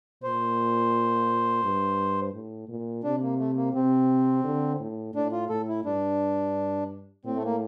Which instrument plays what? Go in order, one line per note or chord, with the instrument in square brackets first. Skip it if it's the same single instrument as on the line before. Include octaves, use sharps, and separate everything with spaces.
[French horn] A#2 [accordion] C5
[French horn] G2
A2
A#2
[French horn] C3 [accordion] D4
[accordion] A#3
A3
A#3
[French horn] C3 [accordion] C4
[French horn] D3
A2
[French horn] A2 [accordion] D4
[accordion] F4
[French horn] A2 [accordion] A4
[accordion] E4
[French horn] G2 [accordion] D4
[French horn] A2 [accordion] C4
[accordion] A3
A#3